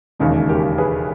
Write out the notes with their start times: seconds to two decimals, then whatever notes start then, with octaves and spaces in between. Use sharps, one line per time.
0.19 E1 D#2 C#3 G#3 D#4
0.49 G4 A#4
0.78 G#4 B4